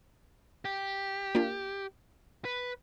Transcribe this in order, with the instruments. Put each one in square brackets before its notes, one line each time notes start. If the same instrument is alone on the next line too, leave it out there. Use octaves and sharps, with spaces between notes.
[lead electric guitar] G4
[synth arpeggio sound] A#3 D4 F4
[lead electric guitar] B4